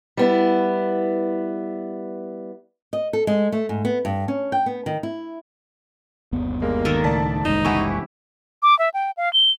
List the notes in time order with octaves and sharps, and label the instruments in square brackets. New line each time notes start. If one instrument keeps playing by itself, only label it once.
[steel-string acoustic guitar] G3 B3 E4
[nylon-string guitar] D#5
A4
G#3
A3
G#2
B3
G2
C#4
G5
B3
D#3
E4
[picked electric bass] G1 D#2 B3
[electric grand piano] G3 G#3 [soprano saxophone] A#3
[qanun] D#3 A4 A#4
[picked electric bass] C#2 A2 [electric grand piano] D5 A5 B6
[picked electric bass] F#1 C2 G#3 [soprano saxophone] D#4 [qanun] C5
[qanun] E3 E4 G4 [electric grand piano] F#5 G#5 C#6
[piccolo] D6
E5
G5
F5
G7